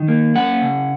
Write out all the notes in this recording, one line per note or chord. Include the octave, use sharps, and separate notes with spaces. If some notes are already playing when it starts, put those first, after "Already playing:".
Already playing: D#3
A#3
C#4 F#5
C#3